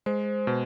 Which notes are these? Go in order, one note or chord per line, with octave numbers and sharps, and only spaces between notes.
G#3 C5
B2